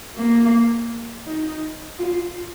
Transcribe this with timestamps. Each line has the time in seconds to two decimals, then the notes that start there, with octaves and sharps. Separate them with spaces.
0.16 A#3
1.26 D#4
1.99 F4